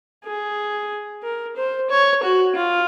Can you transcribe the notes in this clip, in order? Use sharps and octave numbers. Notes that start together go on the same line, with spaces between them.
G#4
A#4
C5
C#5
F#4
F4